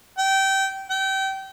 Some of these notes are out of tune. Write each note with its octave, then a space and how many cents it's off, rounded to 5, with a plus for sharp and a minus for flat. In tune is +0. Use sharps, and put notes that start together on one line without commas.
G5 -20
G5 -30